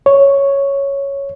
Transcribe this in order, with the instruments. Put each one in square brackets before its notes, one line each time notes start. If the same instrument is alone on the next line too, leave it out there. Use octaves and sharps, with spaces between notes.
[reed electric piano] C#5